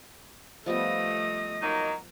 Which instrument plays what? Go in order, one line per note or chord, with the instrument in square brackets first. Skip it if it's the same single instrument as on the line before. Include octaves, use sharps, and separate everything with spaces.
[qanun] F3 G3 B3 [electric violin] A3 D#6 [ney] D#5
[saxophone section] F#3 A#3 D#4